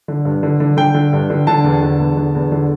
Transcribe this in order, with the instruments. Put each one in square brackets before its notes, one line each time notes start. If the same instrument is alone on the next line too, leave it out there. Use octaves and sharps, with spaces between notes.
[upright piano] D3
G2
D3
D3
D3 G5
D3
G2
D3
D3 A5
E2
D3
E2
D3
E2
D3